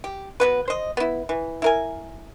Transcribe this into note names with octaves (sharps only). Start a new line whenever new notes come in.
G4
F#3 B3 B4
C5 D#5
B3 E4
E3
E4 A#4 G#5